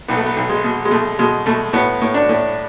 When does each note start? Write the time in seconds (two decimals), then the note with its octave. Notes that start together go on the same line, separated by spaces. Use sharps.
0.08 B1 B3
0.17 A3
0.26 B3
0.36 B1
0.49 G#3
0.64 B2
0.85 G#3
0.91 B2 A3
1.19 B2 G#3
1.46 B2 A3
1.73 A2 B3
2.01 A2
2.14 D4
2.29 A2